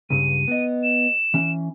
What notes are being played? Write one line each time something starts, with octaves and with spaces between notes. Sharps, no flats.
C#2 G2 C#3 D#7
B3 D#5
E7
E3 C#4